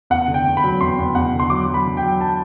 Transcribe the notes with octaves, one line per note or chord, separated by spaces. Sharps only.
E2 F#5
D3
G5
E2
B5
F#3
E2 C6
E2
E2 F#5
D3
C6
F#3 D6
F#3
B5
D3
G5
F#3
A5